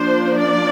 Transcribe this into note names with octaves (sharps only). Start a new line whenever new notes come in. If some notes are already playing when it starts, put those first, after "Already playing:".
Already playing: F3 A#3 D4 C5
D5